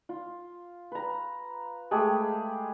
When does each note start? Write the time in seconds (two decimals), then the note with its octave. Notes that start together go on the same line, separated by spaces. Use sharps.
0.09 F4
0.92 B4 A#5
1.91 G#3 A3 G4 G#4